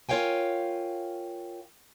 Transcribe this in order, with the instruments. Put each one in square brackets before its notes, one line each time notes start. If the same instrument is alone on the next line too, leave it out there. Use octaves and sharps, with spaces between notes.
[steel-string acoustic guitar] F4 A#4 C#5 F5 G5 G#5